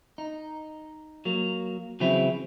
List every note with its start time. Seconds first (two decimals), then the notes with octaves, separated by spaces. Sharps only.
0.18 D#4
1.25 F#3 A#3
2.00 C#3 E3 F#3 C4 E4